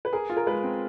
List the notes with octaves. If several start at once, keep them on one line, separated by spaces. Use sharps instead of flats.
B4
G#4 A#4
F4
A#4
G#3 B4
C4